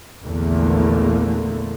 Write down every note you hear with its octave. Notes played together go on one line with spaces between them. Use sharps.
A#1 E2 D3 A3 A#3